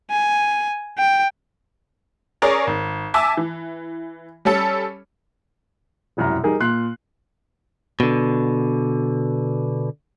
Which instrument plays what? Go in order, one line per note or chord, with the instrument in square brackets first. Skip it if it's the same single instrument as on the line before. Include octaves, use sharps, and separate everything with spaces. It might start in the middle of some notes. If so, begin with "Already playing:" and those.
[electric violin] G#5
G5
[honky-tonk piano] C#4 G#4 A#4 C#5 D5
G#1
E5 G#5 A5 D6 E6
E3
G3 C#4 A4
[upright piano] E1 C2 F#2 E4 A#5
G3 D#4 G#4 A#4
A#2 C6 F#6 C7
[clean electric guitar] B2 D3